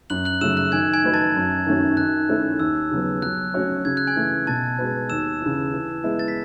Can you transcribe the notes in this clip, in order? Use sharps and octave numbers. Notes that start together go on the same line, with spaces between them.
F#2 F#6 F#7
F#6 F#7
C#3 F#3 A3 E6 E7
F#6
D#3 G#5 G#6
G#5 G#6
A3 D#4 F#4 B4
A5 A6
F#2
D#3 A3 C#4 F#4
D#3 F#6
A3 C#4 E4 A4
D#2 E6
C#3 F#3 B3
F#3 F#6
A3 C#4 F#4 C#5
C#3 G#6
F#6
G#5 G#6
E3 A3
B2 A5 A6
G#3 B3 F#4 B4
D#2 E6 E7
C#3 E3
E3
G#3 B3 E4
A6
B6